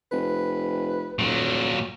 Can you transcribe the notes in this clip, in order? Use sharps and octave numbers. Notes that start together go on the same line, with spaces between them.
F1 B4
D#1 A#2 F#3